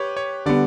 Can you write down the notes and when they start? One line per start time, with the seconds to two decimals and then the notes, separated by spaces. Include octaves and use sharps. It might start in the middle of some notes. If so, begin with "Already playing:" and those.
Already playing: G4 B4 C#5
0.17 C#5
0.46 D3 G3 B3 D5